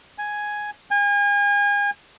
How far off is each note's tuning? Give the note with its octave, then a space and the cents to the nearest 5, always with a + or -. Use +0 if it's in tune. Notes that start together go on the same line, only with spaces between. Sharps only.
G#5 +5
G#5 -35